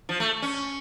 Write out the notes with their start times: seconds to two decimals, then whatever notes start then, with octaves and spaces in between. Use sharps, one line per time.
0.09 F3
0.20 A3
0.42 C#4